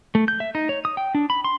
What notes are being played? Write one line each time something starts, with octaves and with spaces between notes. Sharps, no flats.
A3
G6
E5
D#4
C#5
D#6
G5
D4
B5
C6